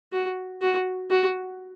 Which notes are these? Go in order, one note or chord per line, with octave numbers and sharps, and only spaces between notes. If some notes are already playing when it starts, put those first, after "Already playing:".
F#4
F#4
F#4